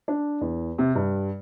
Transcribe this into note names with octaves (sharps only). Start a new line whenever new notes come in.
D4
E2
C3
G2